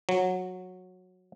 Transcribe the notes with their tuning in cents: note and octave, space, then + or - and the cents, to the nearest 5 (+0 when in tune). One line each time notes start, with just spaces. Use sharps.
F#3 -15